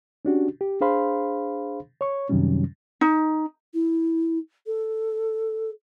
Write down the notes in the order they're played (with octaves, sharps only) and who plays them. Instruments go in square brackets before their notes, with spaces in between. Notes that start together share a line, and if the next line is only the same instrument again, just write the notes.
[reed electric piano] C#4 D4 F#4 G4
G4
D4 G#4 C5 F5 B5 C6
C#5 C#6
F#2 C3 D#3 F#3 G3 C#4
[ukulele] D#4
[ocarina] E4
A4